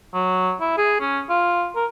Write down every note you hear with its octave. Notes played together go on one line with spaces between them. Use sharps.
F#3
E4
G#4
C#4
F4
A#4